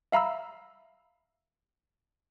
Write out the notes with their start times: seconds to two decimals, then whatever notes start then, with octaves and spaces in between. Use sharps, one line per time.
0.12 E5 F5 A#5 B5 E6